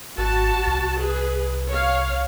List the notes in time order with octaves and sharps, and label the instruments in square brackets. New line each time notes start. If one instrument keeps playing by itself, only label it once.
[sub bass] G#1 [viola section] F#4 A5
[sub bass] C2
[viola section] G#4 B4
C#5 F5